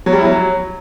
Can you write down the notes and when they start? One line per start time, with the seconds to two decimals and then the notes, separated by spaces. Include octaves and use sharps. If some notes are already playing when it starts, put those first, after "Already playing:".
0.06 F#3
0.13 G3
0.19 E4
0.25 F#3